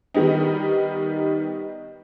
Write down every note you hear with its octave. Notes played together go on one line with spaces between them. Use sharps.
D#3 G3 B3 D#4